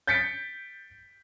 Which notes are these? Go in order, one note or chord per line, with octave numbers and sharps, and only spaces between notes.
G6 A6 B6 C#7 D7